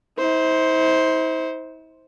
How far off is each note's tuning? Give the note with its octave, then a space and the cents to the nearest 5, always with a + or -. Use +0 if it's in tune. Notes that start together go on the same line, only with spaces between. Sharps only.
E4 -45 C5 +0